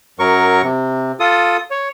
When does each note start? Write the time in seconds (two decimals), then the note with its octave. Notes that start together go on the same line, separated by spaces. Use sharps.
0.19 F#2 F#3 A#4 C#6
0.63 C3
1.20 F4 A4 D#6
1.71 C#5